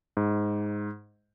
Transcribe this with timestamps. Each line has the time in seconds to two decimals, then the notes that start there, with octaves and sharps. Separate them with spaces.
0.17 G#2